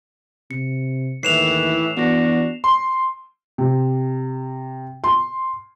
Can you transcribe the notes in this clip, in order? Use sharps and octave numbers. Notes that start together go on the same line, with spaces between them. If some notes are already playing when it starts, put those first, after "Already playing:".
C3 C#7
D#2 A2 E3 C7 E7 F7
E3 B3 D4 F#4 A#6
C6
C3
C6